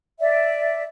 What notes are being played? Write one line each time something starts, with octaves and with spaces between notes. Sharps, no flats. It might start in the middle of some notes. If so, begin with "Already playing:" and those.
D5 E5